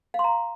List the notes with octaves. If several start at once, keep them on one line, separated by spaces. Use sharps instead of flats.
F5
C6
A#5